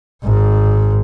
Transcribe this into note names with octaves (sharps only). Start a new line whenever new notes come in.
G#1 G#2